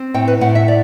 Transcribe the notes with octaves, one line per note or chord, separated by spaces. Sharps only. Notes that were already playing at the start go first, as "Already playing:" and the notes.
Already playing: C4
A2 G5
B4
A2 F#5
E5
D5